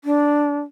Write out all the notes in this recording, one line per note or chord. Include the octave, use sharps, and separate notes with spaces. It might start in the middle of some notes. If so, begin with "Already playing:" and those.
D4